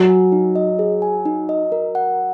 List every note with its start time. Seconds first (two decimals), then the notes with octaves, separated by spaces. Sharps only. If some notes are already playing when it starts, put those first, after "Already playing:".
Already playing: F#3
0.09 G#5
0.32 D#4
0.56 D#5
0.79 G#4
1.02 G#5
1.25 D#4
1.49 D#5
1.72 A#4
1.95 F#5